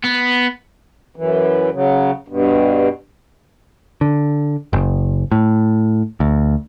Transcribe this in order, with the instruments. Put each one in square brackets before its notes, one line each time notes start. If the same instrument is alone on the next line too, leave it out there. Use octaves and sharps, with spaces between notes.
[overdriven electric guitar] B3
[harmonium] F#2 E3
C#3 F#3
G2 B2
[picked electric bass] D3
F#1
A2
D2